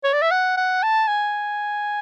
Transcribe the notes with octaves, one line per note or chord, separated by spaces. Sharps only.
C#5
D5
E5
F#5
F#5
A5
G#5